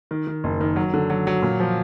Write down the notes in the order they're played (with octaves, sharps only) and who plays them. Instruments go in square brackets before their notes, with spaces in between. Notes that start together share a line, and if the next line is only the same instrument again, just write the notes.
[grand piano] D#3
D#3
F#1
D#3
F#3
D3
F#3
F#3
A#2
F3